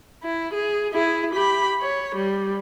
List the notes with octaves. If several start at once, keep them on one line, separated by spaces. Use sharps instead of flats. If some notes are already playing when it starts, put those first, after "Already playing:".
E4
G#4
E4 G#4
G4 B5
C#5
G3